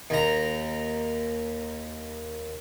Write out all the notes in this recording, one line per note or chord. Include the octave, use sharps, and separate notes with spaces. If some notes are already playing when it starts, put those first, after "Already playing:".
D#2 A#5